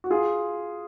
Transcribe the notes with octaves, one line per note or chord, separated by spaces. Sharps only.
F#4
F4 G#4